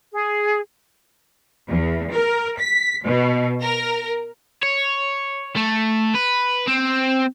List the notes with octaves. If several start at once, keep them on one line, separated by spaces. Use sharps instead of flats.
G#4
E2
A#4
B6
B2
A#4
C#5
A3
B4
C4